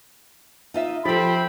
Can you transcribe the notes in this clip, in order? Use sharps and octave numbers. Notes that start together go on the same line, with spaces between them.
D#4 F4 E5
F3 C4 G4 A4 G5 B5